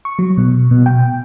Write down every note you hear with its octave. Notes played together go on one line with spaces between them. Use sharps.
C#6
F#3
B2
B2
G5